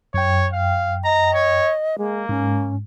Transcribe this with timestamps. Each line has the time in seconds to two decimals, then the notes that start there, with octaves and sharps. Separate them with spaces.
0.14 F#2 C#5 G5
0.53 F5
1.04 D#5 A#5
1.34 C#5
1.98 G#3 A#3
2.29 G#2 C#4